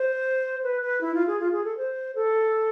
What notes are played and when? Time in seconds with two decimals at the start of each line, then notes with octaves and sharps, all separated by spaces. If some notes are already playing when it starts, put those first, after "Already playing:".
Already playing: C5
0.64 B4
0.82 B4
1.01 E4
1.14 F4
1.27 G#4
1.40 F4
1.52 G#4
1.64 A4
1.77 C5
2.15 A4